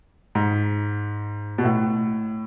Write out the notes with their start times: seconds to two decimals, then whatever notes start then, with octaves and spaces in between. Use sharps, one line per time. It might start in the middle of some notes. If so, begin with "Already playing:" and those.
0.35 G#2
1.58 B2
1.65 A2